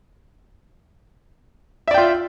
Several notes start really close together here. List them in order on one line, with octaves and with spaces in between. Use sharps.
E5 D5 G5 F4